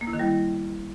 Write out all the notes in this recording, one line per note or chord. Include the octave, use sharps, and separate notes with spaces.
A#3
E4
D#3
G3